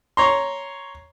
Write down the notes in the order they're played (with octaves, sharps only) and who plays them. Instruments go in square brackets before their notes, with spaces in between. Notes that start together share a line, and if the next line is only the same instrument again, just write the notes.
[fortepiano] C#5 A#5 C6